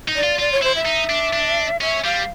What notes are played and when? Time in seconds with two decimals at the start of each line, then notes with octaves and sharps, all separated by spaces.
0.08 D#4
0.15 D5
0.23 F4
0.40 F4 D5
0.52 C#5
0.63 E4 C5
0.74 E5
0.86 D#4
1.10 D4
1.33 D4
1.81 C#4 E5
2.04 G3 F5